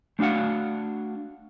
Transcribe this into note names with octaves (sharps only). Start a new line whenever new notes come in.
A3 D4 F#4 F5 F#5